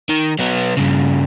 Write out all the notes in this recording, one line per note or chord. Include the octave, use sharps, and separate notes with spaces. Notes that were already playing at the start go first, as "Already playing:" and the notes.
D#3
F#3 B3
G2 C#3